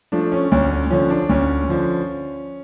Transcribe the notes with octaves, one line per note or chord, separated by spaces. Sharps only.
F3 A3 D4
C#4
D2 C#4
C#4
D3 F3 C#4
D4
D2 C#4
D3 F3